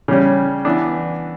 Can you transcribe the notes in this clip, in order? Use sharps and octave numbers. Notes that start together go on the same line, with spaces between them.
C#3 G3 C#4
E3 B3 D4